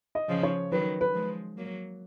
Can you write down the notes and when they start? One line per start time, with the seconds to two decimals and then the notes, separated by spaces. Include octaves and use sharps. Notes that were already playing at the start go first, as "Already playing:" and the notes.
0.15 D#5
0.29 C#3 F3
0.43 C#5
0.72 D#3 F#3 B4
1.01 B4
1.14 F3 G#3
1.57 F#3 A#3